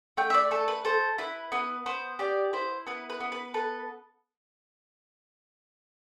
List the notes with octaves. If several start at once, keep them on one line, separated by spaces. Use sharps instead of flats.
A3 G5
E5
D5
A3 A4
B4
A4 C5
E4 B4
B3 B4
B3 C5
G4 D5
E4 C5
B3 B4
B4
B3
B4
A4 B4